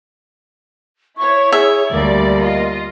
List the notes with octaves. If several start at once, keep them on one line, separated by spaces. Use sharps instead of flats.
E4 C#5 C#6
G#4 E5
D2 G3 A#3 D5
F4 D#5